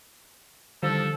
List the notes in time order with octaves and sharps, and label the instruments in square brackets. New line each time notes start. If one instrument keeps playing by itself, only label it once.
[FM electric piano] D3 D#3 G3 [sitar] F3 [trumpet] A4